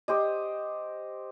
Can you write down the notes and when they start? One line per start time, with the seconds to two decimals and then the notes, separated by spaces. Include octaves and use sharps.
0.08 G4 C5 D#5